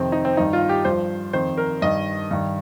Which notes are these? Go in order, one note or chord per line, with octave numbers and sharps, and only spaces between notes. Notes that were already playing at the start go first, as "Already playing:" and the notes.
Already playing: F2 C3 D#3 C4
D#4
C4
G2 D#3 D#4
F4
G4
G2 F3 C5
F2 D#3 C5
A#4
G2 D#3 D#5
G2 D#3